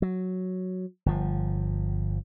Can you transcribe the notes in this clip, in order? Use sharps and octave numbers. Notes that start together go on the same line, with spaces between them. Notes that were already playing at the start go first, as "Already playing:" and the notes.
F#3
G1 F3